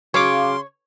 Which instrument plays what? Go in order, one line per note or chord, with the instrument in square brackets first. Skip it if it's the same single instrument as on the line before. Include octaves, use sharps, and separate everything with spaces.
[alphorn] C#3 [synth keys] F#3 F5 D6 [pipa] C#5 [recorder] C6